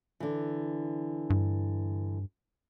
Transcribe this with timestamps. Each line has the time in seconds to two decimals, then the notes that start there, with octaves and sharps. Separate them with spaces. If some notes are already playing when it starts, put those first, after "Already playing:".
0.20 D3 E3
1.30 G2